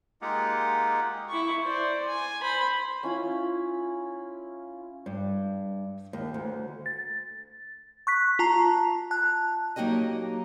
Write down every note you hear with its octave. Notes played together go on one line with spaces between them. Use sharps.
G#3 A#3 D#4 F4 G4 F#5
E4 C#6
C5 D5
G#5
C5 B5
C#4 E4 F4
G2
D#2
D2
A6
C#6 F#6 B6
F4 A5 A#5
A5 F#6
F#3 A#3 D#4 F#4 G4 D#5